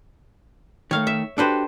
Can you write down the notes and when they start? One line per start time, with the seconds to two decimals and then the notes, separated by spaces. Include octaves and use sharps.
0.91 D#3 A3 C#5 F5
1.07 E5
1.38 D4 F#4 G4 A4 B4 C5